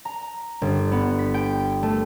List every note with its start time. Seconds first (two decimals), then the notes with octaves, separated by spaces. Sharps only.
0.05 A#5
0.62 G1
0.92 B3
1.19 B6
1.34 G5
1.83 A3